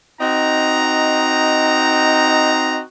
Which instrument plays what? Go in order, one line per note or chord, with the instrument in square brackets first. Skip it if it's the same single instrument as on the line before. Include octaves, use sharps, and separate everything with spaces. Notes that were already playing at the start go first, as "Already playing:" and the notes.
[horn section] C4 D#4 F#4 D#5 A#5